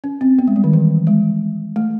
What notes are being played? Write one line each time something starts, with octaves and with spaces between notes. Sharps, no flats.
C#4
C4
B3
G#3
G3
D#3
E3
G#3
A3